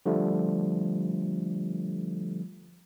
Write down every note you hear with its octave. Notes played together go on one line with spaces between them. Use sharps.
D3 F3 G3 A3